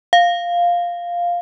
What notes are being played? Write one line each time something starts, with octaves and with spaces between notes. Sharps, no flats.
F5